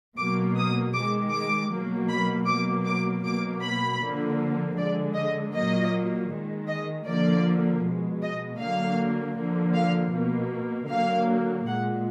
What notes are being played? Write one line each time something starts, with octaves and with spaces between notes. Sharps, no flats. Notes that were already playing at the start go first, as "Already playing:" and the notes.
B2 F#3 A#3 D6
D#6
D#3 G#3 D6
D6
B2 F#3 A#3
B5
B2 F#3 A#3 D6
D6
B2 F#3 A#3 D6
B5
D3 F3 A#3
D3 G#3 D5
D#5
A#2 F#3 A#3 D#5
D#3 G#3
D#5
D3 F3 A#3 D5
B2
G#3
D#5
D3 F#3 A#3 F5
D3 F3 A#3
F5
B2 A#3
D3 F#3 A#3 F5
A#2 G#3 F#5